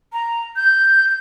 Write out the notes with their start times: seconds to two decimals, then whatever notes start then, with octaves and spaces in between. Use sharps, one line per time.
0.13 A#5
0.56 G6